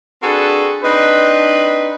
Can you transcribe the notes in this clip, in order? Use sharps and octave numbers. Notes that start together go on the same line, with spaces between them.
C4 D4 F#4 G#4 A4 B4
C4 D4 D#4 B4